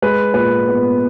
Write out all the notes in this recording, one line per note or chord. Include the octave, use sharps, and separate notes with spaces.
G#3 B4
A#2 B4
B3